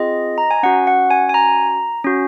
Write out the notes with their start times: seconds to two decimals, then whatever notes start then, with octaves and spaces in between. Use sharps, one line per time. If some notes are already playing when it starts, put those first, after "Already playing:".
Already playing: C4 F4 G#4 D#5
0.38 A#5
0.51 G#5
0.63 C#4 F#4 F#5
0.87 F#5
1.10 G#5
1.29 G#5
1.34 A#5
2.04 C#4 F#4